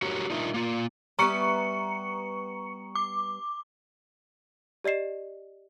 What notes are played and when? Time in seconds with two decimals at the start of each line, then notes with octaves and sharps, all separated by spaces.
0.02 F#4 G4 A#4 C#5
0.30 D4 D#4 F4 A#4 D#5 E5
0.54 A#3 F4
1.19 G3 B3 E5 A#5 C#6 C#7
2.95 D6
4.84 G4 D5 D#5 C7 E7